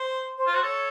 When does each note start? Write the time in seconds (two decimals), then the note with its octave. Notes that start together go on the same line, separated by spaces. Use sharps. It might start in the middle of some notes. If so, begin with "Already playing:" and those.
Already playing: C5
0.38 C5
0.46 F4
0.52 F#4 C5
0.63 A4 C#5